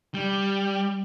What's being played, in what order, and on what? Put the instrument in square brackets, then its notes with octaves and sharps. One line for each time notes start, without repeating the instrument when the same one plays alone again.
[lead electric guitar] G3